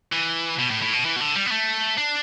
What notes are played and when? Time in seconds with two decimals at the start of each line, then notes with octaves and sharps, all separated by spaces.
0.12 E3
0.58 B2
0.70 A2
0.82 A2
0.93 B2
1.05 E3
1.16 B2
1.20 D3
1.36 G3
1.46 B3
1.51 A3
1.98 D4